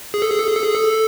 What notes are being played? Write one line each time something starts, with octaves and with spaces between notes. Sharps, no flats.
G#4
A4
G#4
A4
G#4
A4
G#4
A4